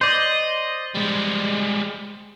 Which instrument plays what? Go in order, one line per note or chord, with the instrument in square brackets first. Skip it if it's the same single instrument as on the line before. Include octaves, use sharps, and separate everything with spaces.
[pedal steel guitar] C5 D5 [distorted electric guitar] D#5
[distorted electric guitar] G3 G#3